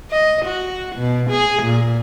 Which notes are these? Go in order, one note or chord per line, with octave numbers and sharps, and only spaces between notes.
D#5
F#4
B2
G#4
A#2